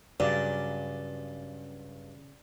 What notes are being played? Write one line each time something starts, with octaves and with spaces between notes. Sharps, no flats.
G2 C#3 F#3 C#4 D5